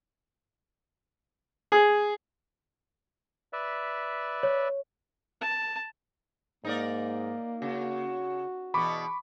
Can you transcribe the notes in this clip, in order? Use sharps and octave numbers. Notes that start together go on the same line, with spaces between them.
G#4
B4 D5 E5
C#5
A5
G#2 A#3 D#4 A#4 D5
C#3 F#4
E2 B2 B3 B5 C#6 D6